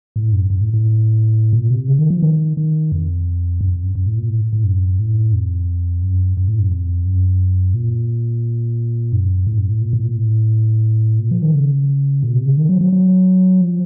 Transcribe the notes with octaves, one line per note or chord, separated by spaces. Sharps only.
A2
F#2
F#2
A2
A2
A#2
C3
C#3
D#3
F3
D#3
D#3
F2
F#2
F2
F#2
F#2
A2
A#2
A2
A2
F#2
A2
F2
F#2
F#2
A2
F#2
F2
F#2
A#2
F#2
A2
F#2
A2
A#2
A2
A#2
A2
A#2
F3
D#3
C#3
A#2
C3
C#3
D#3
F#3
F#3
F#3
F3